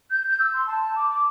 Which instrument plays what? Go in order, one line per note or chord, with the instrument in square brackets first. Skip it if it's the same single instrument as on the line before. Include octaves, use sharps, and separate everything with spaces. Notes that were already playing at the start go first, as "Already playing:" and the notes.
[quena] G6
G6
E6
C6
A5
D6
D6